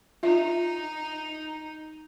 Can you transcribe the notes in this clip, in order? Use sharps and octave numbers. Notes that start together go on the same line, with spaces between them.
D#4 F4 E5